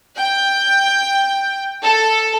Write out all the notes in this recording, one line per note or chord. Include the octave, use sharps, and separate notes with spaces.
G5
A4